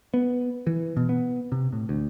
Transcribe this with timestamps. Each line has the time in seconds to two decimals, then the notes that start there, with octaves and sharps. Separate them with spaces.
0.14 B3
0.67 E3
0.97 B2
1.09 B3
1.52 C3
1.73 A2
1.89 D2